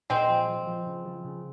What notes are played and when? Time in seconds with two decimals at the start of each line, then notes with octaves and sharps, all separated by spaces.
0.10 A#2 G#3 C4
0.29 F3
0.48 F3
0.67 F3
0.87 C#3
1.06 F3
1.25 C#3